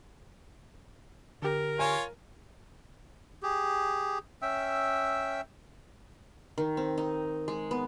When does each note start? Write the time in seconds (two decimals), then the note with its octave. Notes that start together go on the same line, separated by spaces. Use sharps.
1.42 D3 G4 A#4
1.79 F4 C#5 F5 G#5
3.43 G4 G#4
4.42 C#4 E5 G5 E6
6.58 D#3
6.77 C4
6.98 D#4
7.48 G#3
7.71 B3